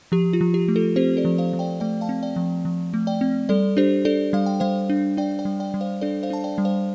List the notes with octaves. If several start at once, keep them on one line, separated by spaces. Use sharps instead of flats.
F3 G4
F4
F3
G4
A3
F4 A4
C4 G4 C5
A4 D5
F3
C5 F5
F3
D5 G5
A3 D5 G5
F5 A5
C4
D5 G5
F3
F3
A3
D5 G5
C4
G3 A4 D5
D4 G4 C5
D4 A4 D5
G3 F5
G5
G3 C5 F5
D4
D4 D5 G5
D5 G5
G3
D5 G5
G3
C5 F5
D4 A4 D5
C5 F5
D4 A5
D5 G5
G3
C5 F5